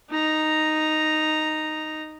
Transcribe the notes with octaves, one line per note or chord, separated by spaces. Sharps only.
D#4 A#5